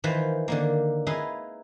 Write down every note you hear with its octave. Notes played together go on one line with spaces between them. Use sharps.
D#3 E3 F4 B4 C5
D3 D#3 A#3
D#4 E4 G#4 B4 D#5 F5